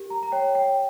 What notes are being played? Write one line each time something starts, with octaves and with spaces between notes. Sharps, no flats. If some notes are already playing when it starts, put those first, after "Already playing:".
Already playing: G4 A#4
A#5
A#5
C#5 G5
G5